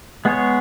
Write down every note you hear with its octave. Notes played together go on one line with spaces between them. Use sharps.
G#3 B3 G#4 C#5